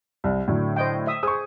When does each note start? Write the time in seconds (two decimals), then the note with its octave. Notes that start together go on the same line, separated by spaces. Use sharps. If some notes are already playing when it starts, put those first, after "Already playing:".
0.24 C2
0.48 A2 D3 F#3
0.76 C5 D#5 G5
1.07 E5 D#6
1.23 G#4 C5 G#5 C#6 D#6